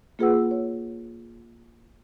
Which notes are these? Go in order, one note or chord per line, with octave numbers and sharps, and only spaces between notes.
A#3 F4 G#4 B4 F#5 E6
C#5